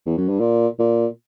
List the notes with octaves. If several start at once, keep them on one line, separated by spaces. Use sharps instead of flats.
E2
F#2
G2
A#2
A#2